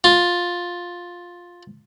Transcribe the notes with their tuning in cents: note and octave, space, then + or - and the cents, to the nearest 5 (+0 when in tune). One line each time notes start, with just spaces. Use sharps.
F4 +10